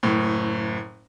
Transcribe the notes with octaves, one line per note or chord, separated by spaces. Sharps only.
F#1 A2